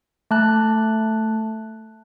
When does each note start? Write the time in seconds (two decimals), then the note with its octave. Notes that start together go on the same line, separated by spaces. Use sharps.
0.31 A3 A5 F#6